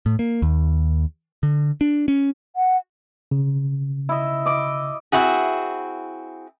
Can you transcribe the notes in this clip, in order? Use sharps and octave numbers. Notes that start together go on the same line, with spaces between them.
A2
A#3
D#2
D3
D4
C#4
F#5
C#3
E4 D#5
D#5 D6
C4 E4 F#4 G#4